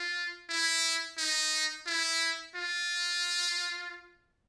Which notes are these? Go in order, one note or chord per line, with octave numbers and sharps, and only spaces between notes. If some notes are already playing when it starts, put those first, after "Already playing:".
Already playing: F4
E4
D#4
E4
F4